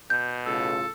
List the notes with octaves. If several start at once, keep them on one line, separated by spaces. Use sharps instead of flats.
B2 G6
A2 C#3 F4 A4